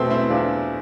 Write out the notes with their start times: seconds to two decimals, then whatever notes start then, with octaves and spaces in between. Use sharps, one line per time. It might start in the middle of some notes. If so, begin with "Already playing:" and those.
Already playing: E2 B2 A3 B3 C4
0.10 C4 E4
0.30 E2 D4 F4